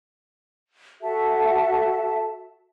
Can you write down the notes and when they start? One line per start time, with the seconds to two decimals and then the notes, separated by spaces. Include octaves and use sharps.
1.01 F#4 A4 E5 A5